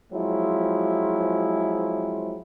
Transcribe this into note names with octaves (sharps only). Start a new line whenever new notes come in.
F3 F#3 G#3 C4 E4